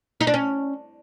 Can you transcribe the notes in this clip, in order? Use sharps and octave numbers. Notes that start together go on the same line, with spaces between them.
D#4
D4
C#4